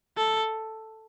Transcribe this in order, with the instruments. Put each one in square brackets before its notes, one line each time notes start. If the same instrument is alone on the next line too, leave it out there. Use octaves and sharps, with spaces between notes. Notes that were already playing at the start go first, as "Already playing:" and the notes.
[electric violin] A4